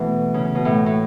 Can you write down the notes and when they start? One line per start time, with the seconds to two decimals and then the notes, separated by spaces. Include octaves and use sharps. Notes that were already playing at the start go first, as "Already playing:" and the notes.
Already playing: B2 E3 A3 B3
0.34 C#3
0.45 C#3
0.55 B2
0.65 A2
0.86 A2